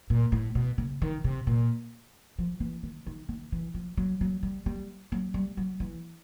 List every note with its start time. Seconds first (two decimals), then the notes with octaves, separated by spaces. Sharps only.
0.10 A#2
0.32 A2
0.55 B2
0.78 C#3
1.02 D#3
1.24 C3
1.47 A#2
2.39 F3
2.60 E3
2.83 D#3
3.06 D#3
3.29 D#3
3.52 E3
3.74 F3
3.97 F#3
4.21 F#3
4.43 G3
4.66 G3
5.12 F#3
5.34 G3
5.57 F#3
5.80 E3